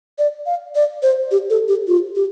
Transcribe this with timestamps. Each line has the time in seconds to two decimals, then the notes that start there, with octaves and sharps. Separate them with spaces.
0.18 D5
0.46 F5
0.75 D5
1.03 C5
1.31 G4
1.50 A4
1.68 G4
1.87 F4
2.15 G4